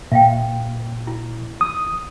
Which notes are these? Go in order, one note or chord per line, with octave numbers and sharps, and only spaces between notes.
A#2 E5 F5 G5
E4
D#6